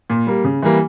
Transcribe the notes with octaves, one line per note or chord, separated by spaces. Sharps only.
A#2
G3 A#3
C#3
E3 G3 A#3